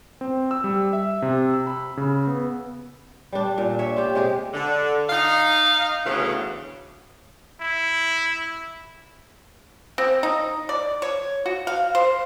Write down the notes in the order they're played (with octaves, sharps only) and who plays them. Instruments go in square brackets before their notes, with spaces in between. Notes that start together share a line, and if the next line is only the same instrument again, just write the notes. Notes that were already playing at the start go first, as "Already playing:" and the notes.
[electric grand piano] C4
E6
G3
E5
C3
E6
B5
C#3
B3
[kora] G3 D4
A#2
C#5 E5
F4 G4
C3 G#3 G4 G#4
[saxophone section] D3
D#4 F5
D2 C#3 E3 B3
[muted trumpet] E4
[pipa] C4
D#4
D5
C#5
F#4
F5
C5